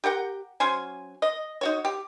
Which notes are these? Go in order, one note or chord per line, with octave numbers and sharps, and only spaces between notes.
G4 A#4 F#5 G5
F#3 C#4 C5 G#5
D#5
D#4 F#4 C#5
G4